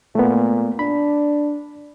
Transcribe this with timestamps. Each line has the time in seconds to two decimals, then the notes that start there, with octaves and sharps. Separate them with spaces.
0.15 A#2 A3 B3
0.79 D4 B5